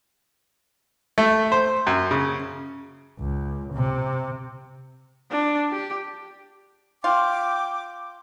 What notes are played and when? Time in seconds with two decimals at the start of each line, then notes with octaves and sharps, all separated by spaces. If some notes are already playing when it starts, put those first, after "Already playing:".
1.18 A3
1.52 C5
1.87 F#2
2.11 C#3
3.19 C#2
3.74 C3
5.31 D4
5.71 G4
7.04 F4 G5 D6